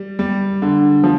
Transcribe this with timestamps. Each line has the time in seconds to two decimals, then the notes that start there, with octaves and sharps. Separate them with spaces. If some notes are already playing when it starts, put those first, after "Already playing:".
Already playing: G3
0.19 G3
0.62 D3
1.04 F3